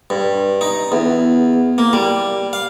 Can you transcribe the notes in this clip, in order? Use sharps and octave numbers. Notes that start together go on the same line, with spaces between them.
G2
D#4
E2
A#3
G3
F5